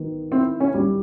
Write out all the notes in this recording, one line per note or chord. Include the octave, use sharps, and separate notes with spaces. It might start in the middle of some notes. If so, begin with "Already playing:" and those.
Already playing: D#3 B3
C4 E4
C#4
G3